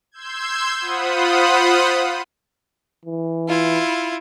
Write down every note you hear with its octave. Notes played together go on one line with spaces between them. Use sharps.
C6 E6 G6 G#6
F4 C5 F#5 B5 D#6
E3
E4 F4